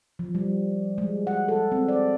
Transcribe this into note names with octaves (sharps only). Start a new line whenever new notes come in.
F3
G3
G#3
F#5
A4
C4
D5